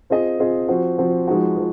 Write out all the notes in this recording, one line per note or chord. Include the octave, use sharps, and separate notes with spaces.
C4 F4 G#4 D#5
C4 F4 G#4 D#5
F3 C4 F#4
F3 C4 F#4
F3 G#3 D#4 F#4
F3